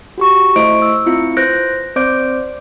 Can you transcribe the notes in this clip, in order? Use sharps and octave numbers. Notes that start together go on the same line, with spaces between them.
F#4 G4 C#6
A3 E4 C5 D#5 C#6 D7
E6
C4 E4 F4 C#7
B4 C5 F#6 G6 A#6 D7
C4 C5 D5 D6 G6 D7